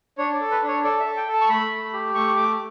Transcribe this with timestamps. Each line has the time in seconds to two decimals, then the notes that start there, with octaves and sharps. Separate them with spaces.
0.18 D4 C#5
0.34 D5
0.40 A4
0.51 B4
0.63 D4
0.68 C#5
0.83 A4 D5
1.00 A4 E5
1.17 G5
1.28 A4
1.33 A5
1.41 C#6
1.49 A3 B5
1.71 A3
1.93 G4
2.14 A3 C#6
2.36 A3 D6